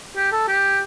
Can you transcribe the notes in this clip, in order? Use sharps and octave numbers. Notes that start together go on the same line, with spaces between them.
G4
A4
G4